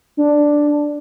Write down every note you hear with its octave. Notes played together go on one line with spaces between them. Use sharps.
D4